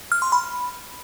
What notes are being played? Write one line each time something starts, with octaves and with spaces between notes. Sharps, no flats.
F6
C6
B5